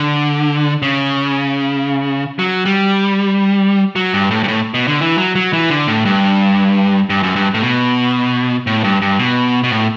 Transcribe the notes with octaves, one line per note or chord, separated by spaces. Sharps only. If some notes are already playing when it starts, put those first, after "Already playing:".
Already playing: D3
C#3
F#3
G3
F#3
G2
A2
G2
A2
B2
D3
E3
F#3
F#3
E3
D3
A2
G2
G2
F#2
G2
A2
B2
A2
G2
G2
B2
B2
A2